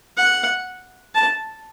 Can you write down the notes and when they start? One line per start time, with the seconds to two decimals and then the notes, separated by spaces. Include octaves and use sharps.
0.17 F#5
1.15 A5